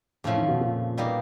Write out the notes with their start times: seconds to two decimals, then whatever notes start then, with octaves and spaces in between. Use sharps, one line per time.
0.24 F2 A2 C#3 F3 A3
0.37 D#3
0.48 B2
0.61 A#2
0.97 B2 G3 A#3 D#4